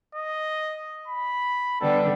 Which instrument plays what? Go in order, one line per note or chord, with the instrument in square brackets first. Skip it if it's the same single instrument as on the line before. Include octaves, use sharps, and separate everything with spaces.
[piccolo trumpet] D#5
B5
[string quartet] D3 G3 B3 [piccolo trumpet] A4